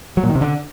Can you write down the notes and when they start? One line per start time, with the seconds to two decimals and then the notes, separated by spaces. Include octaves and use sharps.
0.17 F#3
0.23 A#2
0.29 D#3
0.35 C3
0.41 D3